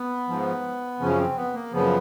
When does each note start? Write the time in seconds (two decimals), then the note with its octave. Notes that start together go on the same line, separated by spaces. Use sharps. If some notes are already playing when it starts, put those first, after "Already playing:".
Already playing: B3
0.28 G#2 F3
1.00 F#2 C#3 F3 C#4
1.17 C4
1.36 B3
1.54 A#3
1.72 F#2 C#3 F3 B3